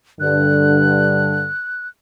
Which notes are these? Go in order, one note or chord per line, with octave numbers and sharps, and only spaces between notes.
G2 D3 F#6